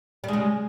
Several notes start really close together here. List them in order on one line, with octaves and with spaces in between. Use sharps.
G3 G#3 C#3